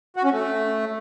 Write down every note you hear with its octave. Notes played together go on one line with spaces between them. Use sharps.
F#4
C#4
A3